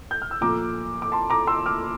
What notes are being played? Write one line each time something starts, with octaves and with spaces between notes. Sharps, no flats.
G6
F6
E6
A#2 F3 A3 A#5 D6
D6
A5 C6
A#5 D6
C6 E6
D6 F6